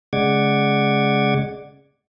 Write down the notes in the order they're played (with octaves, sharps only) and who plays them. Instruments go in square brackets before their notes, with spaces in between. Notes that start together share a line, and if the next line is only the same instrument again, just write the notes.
[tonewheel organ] C#3 G#3 D5 F#5 D6 G#6